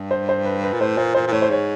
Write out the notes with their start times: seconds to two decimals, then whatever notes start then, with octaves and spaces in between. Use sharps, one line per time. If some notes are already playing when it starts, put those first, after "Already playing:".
Already playing: G2
0.11 C5
0.29 C5
0.45 B4
0.64 B4
0.73 A#2
0.81 A2 C5
0.98 A#2 C5
1.15 A#2 C5
1.27 A#2
1.32 A2 C#5
1.42 C5
1.50 G#2 C#5